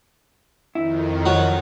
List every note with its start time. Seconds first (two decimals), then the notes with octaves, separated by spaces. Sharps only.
0.75 F2 D#3 E4
1.26 F#3